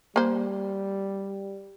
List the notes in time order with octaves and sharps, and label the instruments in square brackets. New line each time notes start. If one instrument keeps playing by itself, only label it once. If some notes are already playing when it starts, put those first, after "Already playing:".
[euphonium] G3 [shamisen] A#3 C5